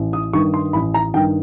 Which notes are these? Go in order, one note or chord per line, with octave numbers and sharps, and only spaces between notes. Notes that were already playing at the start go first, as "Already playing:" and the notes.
Already playing: A1
D#6
G2 D#3 C#6
C6
A1 B5
A#5
G2 D#3 G5